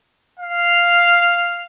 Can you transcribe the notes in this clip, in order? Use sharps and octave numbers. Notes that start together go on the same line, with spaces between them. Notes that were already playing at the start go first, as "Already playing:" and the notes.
F5